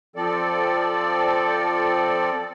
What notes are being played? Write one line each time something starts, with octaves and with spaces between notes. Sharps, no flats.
F3 C4 A4 D5